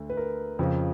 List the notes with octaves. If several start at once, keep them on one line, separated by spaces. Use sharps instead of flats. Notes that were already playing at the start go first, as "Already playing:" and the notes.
Already playing: D2 D3
B4
A#4
F2 C#3 F3